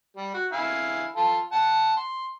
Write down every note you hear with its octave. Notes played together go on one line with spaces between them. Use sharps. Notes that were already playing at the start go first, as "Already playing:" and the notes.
G3
F#4
E4 F5 G#5
F4 A4
F#5 A5
C6